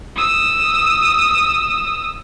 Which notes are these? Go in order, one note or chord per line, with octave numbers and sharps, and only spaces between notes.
D#6 E6